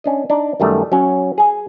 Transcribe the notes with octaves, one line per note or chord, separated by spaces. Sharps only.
C#4 D4 D#5
D4 D#4 D5
F#2 D#3 G3 A3
F#3 C#4
G#4 G#5